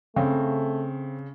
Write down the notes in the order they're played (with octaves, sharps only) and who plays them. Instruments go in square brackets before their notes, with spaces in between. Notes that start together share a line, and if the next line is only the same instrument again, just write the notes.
[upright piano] C#3 [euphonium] A3 [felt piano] C4